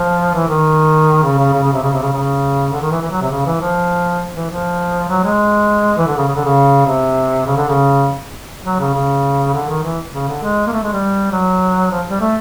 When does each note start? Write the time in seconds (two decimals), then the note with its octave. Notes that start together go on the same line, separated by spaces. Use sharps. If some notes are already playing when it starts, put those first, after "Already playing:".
Already playing: F3
0.34 E3
0.49 D#3
1.23 C#3
1.38 C#3
1.53 C#3
1.63 C#3
1.73 C3
1.83 C#3
1.93 C3
2.02 C#3
2.12 C#3
2.72 D3
2.82 D#3
2.91 E3
3.02 E3
3.11 F#3
3.21 C3
3.31 C#3
3.46 E3
3.61 F3
4.35 E3
4.50 F3
5.09 F#3
5.24 G#3
5.98 E3
6.08 D3
6.17 C#3
6.28 C#3
6.36 D3
6.44 C#3
6.86 C3
7.46 C#3
7.57 D3
7.69 C#3
8.65 F#3
8.79 C#3
8.94 C#3
9.54 D3
9.69 D#3
9.83 E3
10.14 C#3
10.28 D3
10.43 G#3
10.67 A#3
10.72 A3
10.82 G#3
10.92 G3
11.32 F#3
11.91 F3
12.11 G3
12.21 A3